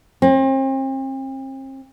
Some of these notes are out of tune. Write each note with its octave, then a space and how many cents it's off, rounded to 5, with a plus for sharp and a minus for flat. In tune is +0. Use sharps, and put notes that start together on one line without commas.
C4 +40